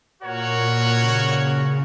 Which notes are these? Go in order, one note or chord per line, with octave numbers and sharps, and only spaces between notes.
A#2 F#4 A#4 C#5
C#3